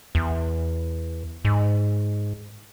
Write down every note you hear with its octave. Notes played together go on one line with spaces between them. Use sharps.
E2
G#2